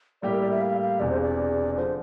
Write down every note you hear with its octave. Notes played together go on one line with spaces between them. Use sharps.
A2 G3 A#3 E4 G4 D5
A#4
D5
E5
F5
F5
E1 E2 C3 D5
C5
D5
D3 F3 C5